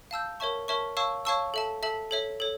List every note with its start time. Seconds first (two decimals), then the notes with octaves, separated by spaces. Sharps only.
0.11 F5 A5 E6 G6
0.40 A#4 C#5 E5 A5 C#6
0.68 A#4 C#5 E5 A5 C#6
0.97 C#5 F5 A5 C#6 E6
1.25 C#5 F5 A5 C#6 E6
1.54 A4 E5 A5
1.83 A4 E5 A5
2.11 A4 C#5 E5
2.40 A4 C#5